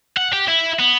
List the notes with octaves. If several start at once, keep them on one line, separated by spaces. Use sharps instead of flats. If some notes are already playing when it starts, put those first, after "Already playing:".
F#5
G4
E4
B3